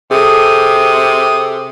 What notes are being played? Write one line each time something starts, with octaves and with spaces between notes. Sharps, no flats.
C3 G#4 A4 D#6